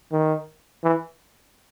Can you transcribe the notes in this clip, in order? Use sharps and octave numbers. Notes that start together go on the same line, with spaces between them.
D#3
E3